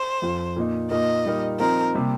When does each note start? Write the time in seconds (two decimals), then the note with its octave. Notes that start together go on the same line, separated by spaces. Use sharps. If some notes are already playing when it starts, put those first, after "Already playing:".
Already playing: C5
0.22 F2 F3 C4 F4
0.56 A#2 A#3 D#4
0.91 A#2 A#3 D#4 A#4 D#5
1.25 A#2 G3 D#4 A#4
1.60 F3 C4 D#4 A#4
1.94 C3 G3 A#3